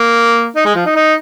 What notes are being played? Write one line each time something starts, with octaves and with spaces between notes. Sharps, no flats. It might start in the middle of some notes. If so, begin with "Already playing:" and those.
Already playing: A#3
D#4
G#3
F3
D#4
D#4